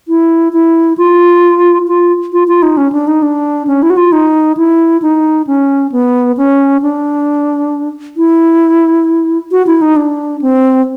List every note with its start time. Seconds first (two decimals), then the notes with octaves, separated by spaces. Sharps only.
0.08 E4
0.53 E4
0.98 F4
1.88 F4
2.33 F4
2.48 F4
2.63 D#4
2.77 C#4
2.92 D4
3.07 D#4
3.23 D4
3.67 C#4
3.83 E4
3.90 F#4
3.97 F4
4.12 D#4
4.57 E4
5.02 D#4
5.47 C#4
5.92 B3
6.37 C#4
6.82 D4
8.17 E4
9.51 F#4
9.67 E4
9.82 D#4
9.96 D4
10.42 C4